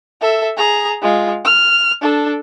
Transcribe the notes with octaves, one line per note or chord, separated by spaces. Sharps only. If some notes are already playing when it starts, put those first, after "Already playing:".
A4 E5
G#4 A#5
G#3 F4
F6
D4 A4